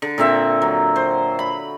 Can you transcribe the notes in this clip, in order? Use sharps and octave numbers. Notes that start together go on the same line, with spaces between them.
D3
A#2 D3 C4 E5
F#3
C5
B5